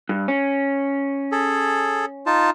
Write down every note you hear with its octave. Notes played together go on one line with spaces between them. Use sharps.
G2
C#4
G#4 A4
D#4 F4 A5